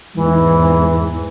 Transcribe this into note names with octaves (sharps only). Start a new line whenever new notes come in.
E2 G#2 E3